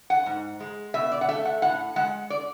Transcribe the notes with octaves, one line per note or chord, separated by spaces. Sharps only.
F#5
G#2
G#3
B2 E5
D5
F#5
A3 E5
F#5
A2 F#5
G#3 F#5
D5